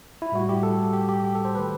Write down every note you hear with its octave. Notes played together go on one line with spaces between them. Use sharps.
E4
A2 G3 F#4
G4
A4
G4
G4
G4
A4
C5
D#3 A3 B4